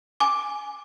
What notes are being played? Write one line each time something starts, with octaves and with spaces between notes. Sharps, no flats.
G#5 D6